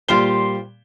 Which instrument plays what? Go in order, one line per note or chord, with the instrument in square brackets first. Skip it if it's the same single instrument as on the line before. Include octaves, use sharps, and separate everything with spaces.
[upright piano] A#2 G3 G7 [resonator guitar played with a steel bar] F4 G4 C5